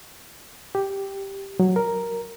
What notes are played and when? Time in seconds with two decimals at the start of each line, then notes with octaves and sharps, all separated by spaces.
0.75 G4
1.60 F#3
1.76 A#4